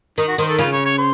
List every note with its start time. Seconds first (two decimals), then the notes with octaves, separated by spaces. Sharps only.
0.18 D#3 D#4
0.28 F#4
0.38 D#3 C5
0.49 A4
0.59 C#3 F4
0.73 C#5
0.86 C#5
0.98 C5